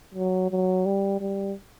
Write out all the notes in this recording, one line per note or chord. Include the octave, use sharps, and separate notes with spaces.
F#3
F#3
G3
G3